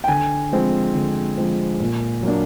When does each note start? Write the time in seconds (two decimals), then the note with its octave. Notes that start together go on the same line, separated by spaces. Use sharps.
0.04 G5
0.08 D3 G#5
0.52 F3 G#3 C4
0.94 D3
1.37 F3 G#3 C4
1.80 A#2
2.23 F#3 A#3 D4